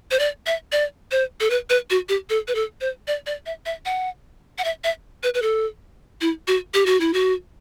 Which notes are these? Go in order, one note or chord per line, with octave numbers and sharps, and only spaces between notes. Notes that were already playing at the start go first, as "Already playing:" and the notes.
C5
D5
E5
D5
C5
A4
B4
B4
F#4
G4
A4
B4
A4
C5
D5
D5
E5
E5
F#5
F#5
E5
E5
B4
B4
A4
E4
F#4
G4
F#4
E4
F#4